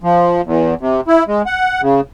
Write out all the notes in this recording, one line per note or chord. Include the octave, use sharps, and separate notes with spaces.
F3
E2
C3
E4
G#3
F#5
C#3